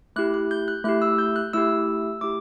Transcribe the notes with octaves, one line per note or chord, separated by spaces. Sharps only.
A3 E4 G4 F#6
F#6
G6
F#6
A3 E4 G4 F#6
E6
G6
F#6
A3 E4 G4 E6
A3 E4 G4 D6